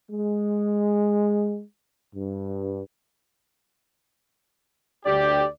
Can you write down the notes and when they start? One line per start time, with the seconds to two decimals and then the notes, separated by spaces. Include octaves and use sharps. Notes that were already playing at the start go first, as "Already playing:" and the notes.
0.10 G#3
2.15 G2
5.06 D2 G4 D5